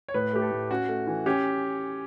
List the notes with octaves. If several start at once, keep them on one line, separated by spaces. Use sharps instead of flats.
C#5
A2 B4
A3 G4
A4
A2
C#4 F#4
A3
E3
C#4 G4